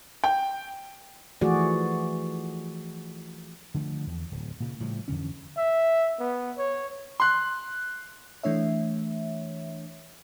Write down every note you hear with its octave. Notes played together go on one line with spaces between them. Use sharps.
G5
E3 F3 A3 F#4 G#4 D5
D3 F3 A3
E2
D1
A#2 C#3
A2 C#3 F3 G3
F2 D3 E3 C#4
E5
B3
C#5
C6 F#6
E3 A3 D4 C#5 E5